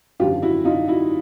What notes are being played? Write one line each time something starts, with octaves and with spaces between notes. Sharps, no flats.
G#1 F#2 D3 F3 F4 G4
E4 F#4
D#4 F4
E4 F#4